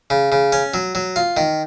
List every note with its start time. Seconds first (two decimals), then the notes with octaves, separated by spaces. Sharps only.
0.10 C#3
0.32 C#3
0.52 C#4
0.74 F#3
0.95 F#3
1.16 F4
1.37 D#3